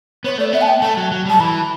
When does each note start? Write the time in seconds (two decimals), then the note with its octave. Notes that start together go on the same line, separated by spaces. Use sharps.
0.24 B3 C#5
0.38 A3 D5
0.53 B3 E5
0.61 A5
0.68 G5
0.82 A3 A5
0.97 F#3
1.12 F#3
1.26 G3 A5
1.40 E3 B5